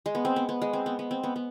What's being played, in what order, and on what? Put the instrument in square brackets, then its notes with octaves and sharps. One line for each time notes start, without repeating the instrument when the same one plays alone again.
[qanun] G#3
B3
C4
B3
B3
G#3
C4
B3
B3
C4
B3
B3